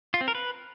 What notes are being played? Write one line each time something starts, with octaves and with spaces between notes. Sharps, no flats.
F4
C4
A#4
B4